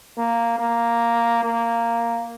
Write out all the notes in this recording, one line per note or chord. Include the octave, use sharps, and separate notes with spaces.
A#3
A#3
A#3